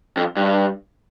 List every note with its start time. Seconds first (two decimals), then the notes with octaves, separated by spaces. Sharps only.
0.17 F2
0.36 G2